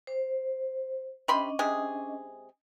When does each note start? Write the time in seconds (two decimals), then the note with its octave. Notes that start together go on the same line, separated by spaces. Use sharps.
0.07 C5
1.28 C3 C#4 D4 D#5 B5 C6
1.59 C3 G#3 G#4